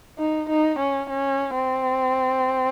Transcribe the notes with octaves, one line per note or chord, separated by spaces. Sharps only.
D#4
D#4
C#4
C#4
C4